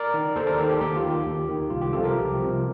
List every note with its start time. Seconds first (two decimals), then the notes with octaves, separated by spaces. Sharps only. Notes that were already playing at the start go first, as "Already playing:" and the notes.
Already playing: A#4 D5
0.14 D#3
0.36 D#2 A4 C5
0.47 A#4 D5
0.58 D#3 A4 C5
0.69 G4 A#4
0.80 D#2 G4
0.96 F4
1.03 D#3
1.10 G4
1.26 D#2
1.49 D#3
1.70 C2 F4
1.81 G4
1.93 C3 F3 F4 A4
2.04 G4 A#4
2.15 C2
2.39 C3 F3